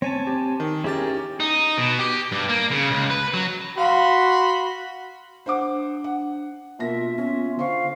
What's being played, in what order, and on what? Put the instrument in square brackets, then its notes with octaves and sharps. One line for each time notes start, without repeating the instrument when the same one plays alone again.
[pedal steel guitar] C4 G#5 A5 [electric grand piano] C#5
[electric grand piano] G4
D#3
[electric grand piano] C#4 G4 A6 [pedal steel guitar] E4 G#4 A#4
[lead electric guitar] D#4
B2
G4
G2
A#3
C#3
C#2
B4
F#3
[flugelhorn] F#4 [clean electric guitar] F5 [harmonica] B5 C6
[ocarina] D4 [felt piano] C5 F#5 D6
[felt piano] F#5
[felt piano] B2 A#3 A#6 [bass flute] F4 [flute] E5
[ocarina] B3 [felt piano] C#4 [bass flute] F4
[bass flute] D3 [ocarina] C5 [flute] F5 [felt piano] C6 C#6